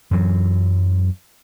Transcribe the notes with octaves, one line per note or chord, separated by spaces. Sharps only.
F#2 E3 F#3